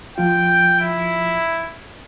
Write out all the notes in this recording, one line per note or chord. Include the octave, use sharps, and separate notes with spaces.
F3 F4 G5
E4